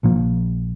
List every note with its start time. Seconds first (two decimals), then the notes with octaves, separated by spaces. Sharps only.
0.03 A#1 A#2 F3 A#3